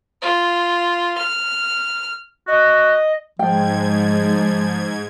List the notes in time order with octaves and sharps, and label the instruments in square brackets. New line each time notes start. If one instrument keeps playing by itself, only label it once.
[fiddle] F4
F6
[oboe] F#4 [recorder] D#5
[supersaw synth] G#2 G#6 [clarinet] F3 [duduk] G#3 [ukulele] G5